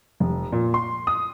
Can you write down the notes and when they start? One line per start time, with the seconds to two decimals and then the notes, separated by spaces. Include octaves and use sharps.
0.20 F1
0.52 A#2
0.74 C6
1.07 D#6